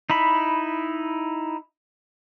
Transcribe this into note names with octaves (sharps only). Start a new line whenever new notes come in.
D#4 E4 B5